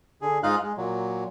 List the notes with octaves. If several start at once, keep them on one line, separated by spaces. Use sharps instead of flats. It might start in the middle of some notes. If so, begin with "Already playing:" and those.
D3 G#4
G#2 D#4 F4 F5 F#6
G#3
A#2 F#3